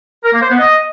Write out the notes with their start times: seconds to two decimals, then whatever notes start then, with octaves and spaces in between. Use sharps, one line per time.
0.25 A#4
0.33 A#3
0.42 C5
0.50 B3
0.59 D#5